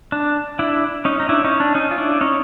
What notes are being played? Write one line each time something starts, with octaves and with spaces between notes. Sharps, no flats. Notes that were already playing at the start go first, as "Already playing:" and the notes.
D4
D4 E4
C#4 D#4
D#4
D4 E4
C#4 D#4
D4
C#4 D#4
F4
D4 E4
C#4 D#4